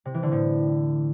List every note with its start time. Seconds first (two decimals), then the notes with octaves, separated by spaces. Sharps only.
0.05 C3
0.14 E3
0.23 D3
0.32 A2